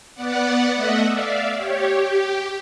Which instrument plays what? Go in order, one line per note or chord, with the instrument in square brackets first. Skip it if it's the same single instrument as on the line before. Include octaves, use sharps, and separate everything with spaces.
[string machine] B3 D5 F#5
A3 D#5 E5 F#5
D5 E5 F5
G4 C#5
G4